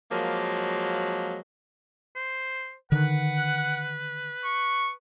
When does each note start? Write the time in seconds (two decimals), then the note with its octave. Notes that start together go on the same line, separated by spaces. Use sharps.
0.11 F3 F#3 G#3 A#3
2.16 C5
2.92 D3 D#3 B4 F#5
4.45 C#6